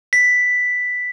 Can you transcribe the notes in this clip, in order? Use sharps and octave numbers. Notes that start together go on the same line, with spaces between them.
B6